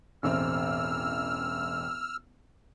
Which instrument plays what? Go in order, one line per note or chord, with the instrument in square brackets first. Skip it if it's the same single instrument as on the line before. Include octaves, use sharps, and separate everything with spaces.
[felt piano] E1 A1 C4 [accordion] E6 F6